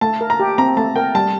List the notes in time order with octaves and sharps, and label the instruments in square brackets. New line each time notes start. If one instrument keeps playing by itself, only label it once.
[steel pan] A3 [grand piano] A5
[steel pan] A#4
[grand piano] A#5
[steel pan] G4
[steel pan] C4 [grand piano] A#5
[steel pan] A3 [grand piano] A5
[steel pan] A#4 [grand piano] G5
[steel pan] G3 [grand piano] A5